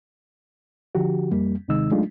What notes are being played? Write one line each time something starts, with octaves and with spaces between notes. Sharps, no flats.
D3 F3 F#4 G4
F2 G3 A#3
D#2 C3 D#3 G#3 D#4 E6
F#3 G#3 A3 D4 D#4 F4